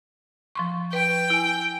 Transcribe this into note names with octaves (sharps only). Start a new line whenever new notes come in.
F3 C6 C#6
B4 G5
E4 G#5